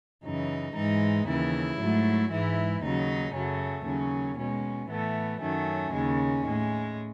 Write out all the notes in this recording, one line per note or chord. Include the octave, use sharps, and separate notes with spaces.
F#2 C#3 E3 D#4
G#2 E3 G#3 D#4
D#2 C#3 E3 E4
G#2 F#3 A3
G#2 E3 G#3 E4
D#2 C#3 F#3 D#4
F#2 C#3 F#3 A3 C#4
D#2 C#3 F#3 C#4
B2 G#3 C#4
A2 E3 A3 B3
F#2 D#3 F#3 A3 C#4
D#2 C#3 G#3
A2 G#3